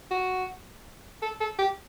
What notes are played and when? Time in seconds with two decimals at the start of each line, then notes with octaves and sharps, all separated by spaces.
0.11 F#4
1.22 A4
1.41 A4
1.59 G4